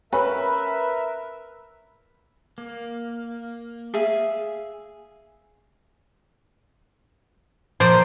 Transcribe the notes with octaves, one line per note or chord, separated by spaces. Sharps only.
C#4 A#4 B4 E5
A#3
G#4 E5 F5
A#2 F3 C5 D5